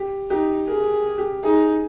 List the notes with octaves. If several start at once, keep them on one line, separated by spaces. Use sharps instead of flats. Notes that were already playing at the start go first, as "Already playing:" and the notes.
Already playing: G4
D#4 G4
G#4 A#4
G4
D#4 G#4